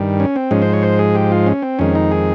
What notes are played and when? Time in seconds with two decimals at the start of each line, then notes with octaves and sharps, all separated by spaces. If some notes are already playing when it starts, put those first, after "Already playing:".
Already playing: G2 D#3 G3
0.20 C#4
0.36 C4
0.51 G#2 F3 G#3 C#4
0.62 C5
0.73 C#5
0.83 C5
0.99 G#4
1.15 G4
1.32 F4
1.47 C#4
1.62 C4
1.79 F2 D#3 G#3 C#4
1.95 D#4
2.11 G#4